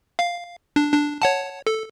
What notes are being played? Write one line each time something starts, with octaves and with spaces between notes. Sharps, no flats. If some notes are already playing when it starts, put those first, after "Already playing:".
F5
D4
D4
C#5 F#5 A5
A4